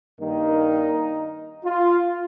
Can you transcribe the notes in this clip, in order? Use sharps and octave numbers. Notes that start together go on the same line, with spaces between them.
G2 D#3 G3 A#3 D#4
F4